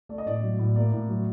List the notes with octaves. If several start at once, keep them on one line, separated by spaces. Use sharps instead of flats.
A3 D5
D#5
A2 D5
F#3
A2
A#3 D5
A2
F#3